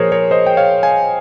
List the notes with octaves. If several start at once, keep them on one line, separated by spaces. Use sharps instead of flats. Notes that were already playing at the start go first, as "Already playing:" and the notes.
Already playing: A#2 F3 G#4 A#4 C5 C#5
A#4 C#5
C5 D#5
G5
C#5 F5
F5 G#5